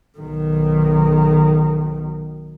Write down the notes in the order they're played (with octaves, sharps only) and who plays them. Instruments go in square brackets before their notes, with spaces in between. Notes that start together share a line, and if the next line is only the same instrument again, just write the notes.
[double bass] B1 D#3